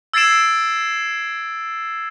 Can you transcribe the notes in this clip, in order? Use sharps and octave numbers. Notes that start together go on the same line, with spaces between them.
E6 G#6 A6 C7 D7 E7